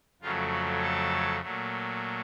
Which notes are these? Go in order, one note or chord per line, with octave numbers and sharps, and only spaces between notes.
F2 C#3 F#3 A3 F4
F#4
A4
A#2 F#3 A3